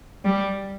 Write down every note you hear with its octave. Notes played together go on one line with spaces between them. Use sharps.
G3